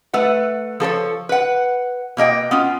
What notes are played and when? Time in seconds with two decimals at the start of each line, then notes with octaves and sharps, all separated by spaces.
0.13 A3 B4 F#5
0.80 F3 A4 A#4 C#5
1.29 B4 F#5
2.17 B2 A#3 D#5 G5
2.51 B3 C#4 F4